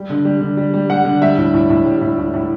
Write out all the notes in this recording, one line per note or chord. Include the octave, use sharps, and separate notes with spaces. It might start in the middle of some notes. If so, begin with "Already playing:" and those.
Already playing: G3
D3
G3
D3
G3
G3
G3 F#5
D3
G3 E5
A2
A2
A2
G3
A2
A2
A2